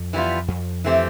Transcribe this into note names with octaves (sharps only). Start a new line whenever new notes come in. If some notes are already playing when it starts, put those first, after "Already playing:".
Already playing: F2
E3 G3 B3 F4
F2
E3 A3 C4 G4